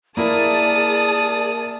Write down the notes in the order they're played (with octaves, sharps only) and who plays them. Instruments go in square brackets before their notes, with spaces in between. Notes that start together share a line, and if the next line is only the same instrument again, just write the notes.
[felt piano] A#3 E4 A#4 [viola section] G#4 A5 [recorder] D5 [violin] D#6